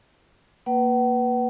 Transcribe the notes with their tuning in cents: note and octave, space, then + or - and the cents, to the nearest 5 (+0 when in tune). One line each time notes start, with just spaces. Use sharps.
A#3 +0 B4 +0 F#5 +40